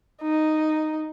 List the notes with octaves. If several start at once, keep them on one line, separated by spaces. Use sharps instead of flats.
D#4